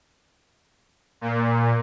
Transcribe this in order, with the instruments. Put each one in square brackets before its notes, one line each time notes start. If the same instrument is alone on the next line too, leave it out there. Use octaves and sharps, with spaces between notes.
[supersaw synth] A#2